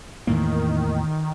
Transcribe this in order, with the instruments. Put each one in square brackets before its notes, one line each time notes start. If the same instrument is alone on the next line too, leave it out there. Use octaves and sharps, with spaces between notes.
[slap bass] E2 A2 A#3 [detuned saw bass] D#3